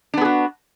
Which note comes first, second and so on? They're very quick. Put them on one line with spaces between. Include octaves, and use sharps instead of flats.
D4 B3 G#4 F#4